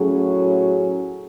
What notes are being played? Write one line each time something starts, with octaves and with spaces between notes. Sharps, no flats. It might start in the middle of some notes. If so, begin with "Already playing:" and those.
Already playing: A2 F#3 C#4 G#4